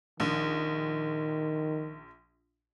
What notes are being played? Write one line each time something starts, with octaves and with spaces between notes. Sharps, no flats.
A#1 D#3